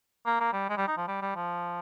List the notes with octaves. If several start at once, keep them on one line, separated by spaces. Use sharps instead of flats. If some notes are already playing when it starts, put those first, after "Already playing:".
A#3
A#3
G3
G#3
G3
D#4
F3
G3
G3
F3